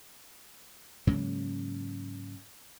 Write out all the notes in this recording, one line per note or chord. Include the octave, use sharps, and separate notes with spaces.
G#2 C#3 F#3 A#3